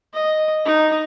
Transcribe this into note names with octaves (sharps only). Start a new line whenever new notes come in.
D#5
D#4